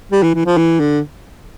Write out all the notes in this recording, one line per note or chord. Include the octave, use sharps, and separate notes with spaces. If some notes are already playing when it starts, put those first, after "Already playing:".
G3
E3
E3
F3
E3
D3